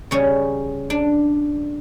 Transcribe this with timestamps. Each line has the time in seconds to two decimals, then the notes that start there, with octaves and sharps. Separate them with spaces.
0.11 C#3 G3 C#4
0.90 D4